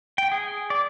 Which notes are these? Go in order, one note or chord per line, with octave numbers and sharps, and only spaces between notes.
G5
G#4
D5